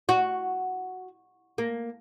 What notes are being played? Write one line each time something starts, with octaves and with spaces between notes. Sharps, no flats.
F#4
A#3